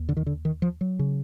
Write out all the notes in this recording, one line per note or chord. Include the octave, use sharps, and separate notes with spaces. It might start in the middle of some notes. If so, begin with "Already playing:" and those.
Already playing: D#2
D3
D#3
D3
D#3
F3
F#3
C#3